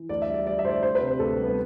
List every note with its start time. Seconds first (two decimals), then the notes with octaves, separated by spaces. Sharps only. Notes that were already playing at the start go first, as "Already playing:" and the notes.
Already playing: E3
0.09 D2 D5
0.22 E5
0.28 G3
0.34 D5
0.46 G3 D5
0.59 E5
0.65 D2 C5
0.71 D5
0.83 D2 C5
0.95 B4
1.01 C3
1.07 C5
1.19 D2 A4
1.38 G3
1.44 B3